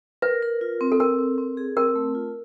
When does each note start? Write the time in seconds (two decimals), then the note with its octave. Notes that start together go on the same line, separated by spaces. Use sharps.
0.22 A#4 B4
0.42 A#4
0.61 F4
0.81 C4
0.92 A4
1.00 C4 A#4
1.19 C4
1.38 C4
1.57 G#4
1.77 C4 A#4
1.95 A3
2.15 F4